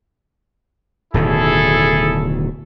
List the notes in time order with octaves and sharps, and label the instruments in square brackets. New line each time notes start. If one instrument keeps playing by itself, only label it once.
[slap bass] D1 B2 D#3 [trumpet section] E4 G#4 A4